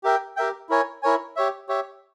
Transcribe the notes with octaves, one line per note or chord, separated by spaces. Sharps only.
G4 A#4 E5 G5
G4 A#4 E5 G5
E4 A#4 C#5 G#5
E4 A#4 C#5 G#5
G4 C#5 E5
G4 C#5 E5